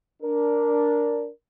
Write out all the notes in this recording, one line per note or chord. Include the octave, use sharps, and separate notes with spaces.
D4 A#4